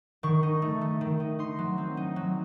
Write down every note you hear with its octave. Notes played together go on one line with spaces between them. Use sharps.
D#3 C#6
D#4
A3
A3
D#3
D#4
D#4 C6
F#3
C4
D#4
F#3